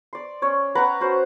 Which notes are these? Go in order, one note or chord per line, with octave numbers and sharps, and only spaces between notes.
D5 C6
C#4 C#5
B4 F#5 G5 A#5
C#4 F#4 C5